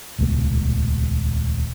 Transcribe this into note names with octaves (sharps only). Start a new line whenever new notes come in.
D#1 C#2 B2 A3